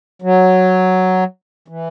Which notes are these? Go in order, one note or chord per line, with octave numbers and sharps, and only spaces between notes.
F#3
E3